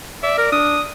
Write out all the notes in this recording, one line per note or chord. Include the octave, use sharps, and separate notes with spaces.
D5 E5
A#4
D4 D#6